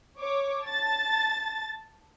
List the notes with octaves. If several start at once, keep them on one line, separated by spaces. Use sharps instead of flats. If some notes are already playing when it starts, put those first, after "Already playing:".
C#5 D6
A5 A6